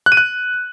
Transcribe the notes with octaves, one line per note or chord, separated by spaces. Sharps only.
F#6
D#7
F#6